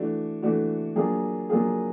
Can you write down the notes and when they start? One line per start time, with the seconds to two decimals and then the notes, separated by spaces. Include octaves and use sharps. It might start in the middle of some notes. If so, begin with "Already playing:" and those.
Already playing: E3 A3 D4 F#4
0.42 E3 A3 D4 F#4
0.96 F#3 A#3 D4 F4 G#4
1.50 F#3 A#3 D4 F4 G#4